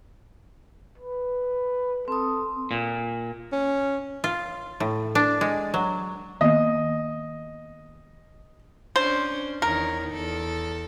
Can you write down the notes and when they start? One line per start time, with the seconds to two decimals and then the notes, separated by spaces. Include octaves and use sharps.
0.98 B4
2.08 C4 A4 D#6
2.71 A#2
3.53 C#4
4.24 F4
4.80 A2
5.15 D4
5.41 G#3
5.74 F#3
6.41 D#3 A#3 B3 D#5
8.96 C#4 D4 C5
9.62 E2 D#3 A#4 C#5
10.12 E2 A4